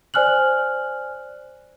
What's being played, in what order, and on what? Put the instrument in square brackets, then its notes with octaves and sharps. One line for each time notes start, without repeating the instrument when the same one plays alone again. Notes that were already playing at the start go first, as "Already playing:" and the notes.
[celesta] C5 D5 G#5 F6 F#6 F#7